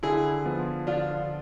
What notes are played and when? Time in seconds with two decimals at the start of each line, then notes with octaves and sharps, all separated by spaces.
0.03 D3 E4 G#4
0.46 F3 B3 F4
0.87 D3 D4 F4